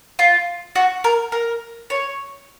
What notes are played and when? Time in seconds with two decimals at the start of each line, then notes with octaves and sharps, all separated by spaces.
0.19 F4
0.76 F#4
1.04 A#4
1.32 A#4
1.90 C#5